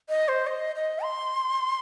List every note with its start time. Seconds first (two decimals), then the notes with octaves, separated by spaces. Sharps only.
0.09 D#5
0.28 C5
0.47 D#5
0.76 D#5
1.03 C6